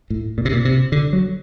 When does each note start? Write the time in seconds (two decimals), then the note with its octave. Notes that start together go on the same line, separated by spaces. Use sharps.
0.10 A2
0.38 A#2
0.45 C3
0.52 A#2
0.65 C3
0.92 D3
1.13 F#3